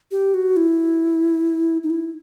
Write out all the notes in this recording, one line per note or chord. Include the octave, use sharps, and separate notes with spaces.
G4
F#4
E4
D#4
E4